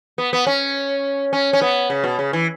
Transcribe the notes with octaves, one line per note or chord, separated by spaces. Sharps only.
B3
B3
C#4
C#4
C#4
B3
C#3
B2
C#3
E3